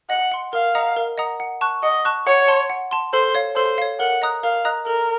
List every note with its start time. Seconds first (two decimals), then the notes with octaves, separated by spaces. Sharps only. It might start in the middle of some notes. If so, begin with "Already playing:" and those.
0.09 D#5 F#5
0.32 F#5 C6
0.53 A#4 F5
0.75 D#5 F#5 A#5 D#6
0.96 A#4
1.18 D#5 F#5 A#5 D#6
1.40 F#5
1.61 A5 C#6 F#6
1.82 D#5 F#5
2.05 A5 C#6 F#6
2.26 C#5 F#5
2.48 A5 C6
2.70 F#5
2.91 A5 C6
3.13 A4 C5
3.35 C#5 F5
3.56 A4 C5
3.78 C#5 F5
4.00 A#4 F#5
4.22 D#5 A#5 D#6 F#6
4.43 A#4 F5
4.65 D#5 A#5 D#6 F#6
4.86 A4 A#4